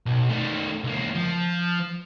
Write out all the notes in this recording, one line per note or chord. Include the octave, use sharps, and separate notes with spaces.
B1
D#3 A3
C#2 A#3
F3